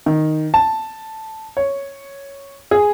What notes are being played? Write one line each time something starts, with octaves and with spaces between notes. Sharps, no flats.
D#3
A5
C#5
G#4